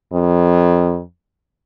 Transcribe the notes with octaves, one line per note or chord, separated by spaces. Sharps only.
F2